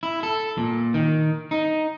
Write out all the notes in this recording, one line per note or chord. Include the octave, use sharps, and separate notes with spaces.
E4
A4
A#2
D#3
D#4